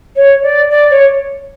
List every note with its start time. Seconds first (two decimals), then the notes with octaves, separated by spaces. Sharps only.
0.16 C#5
0.43 D5
0.70 D5
0.90 C#5